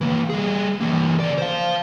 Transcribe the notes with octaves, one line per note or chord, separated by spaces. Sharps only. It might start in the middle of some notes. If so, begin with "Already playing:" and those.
E3 A#3
G3 G#4
E3 A#3
C#3 D5
C5 F5